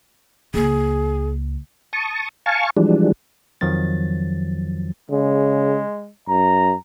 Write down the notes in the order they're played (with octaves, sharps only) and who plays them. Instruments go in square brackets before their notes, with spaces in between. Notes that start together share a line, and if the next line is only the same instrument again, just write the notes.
[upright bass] C#2 A#3 [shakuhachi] G#4
[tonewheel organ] A5 C#6 D#6
F5 G#5 A5 C#6
E3 F3 G3 G#3 D4
[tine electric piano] F2 D#3 F3 F#3 A6
[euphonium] C#3 [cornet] G#3
[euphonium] F#2 [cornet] A#5